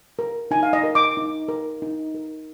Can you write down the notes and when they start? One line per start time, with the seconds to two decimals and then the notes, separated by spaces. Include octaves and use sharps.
0.19 A#4
0.51 D#4 G#5
0.63 F5
0.73 D#5
0.84 A#4
0.95 D6
1.17 D#4
1.48 A#4
1.82 D#4
2.15 A#4